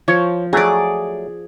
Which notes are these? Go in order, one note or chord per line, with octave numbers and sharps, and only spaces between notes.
F3 C#5
F#3 A3 G#4 D5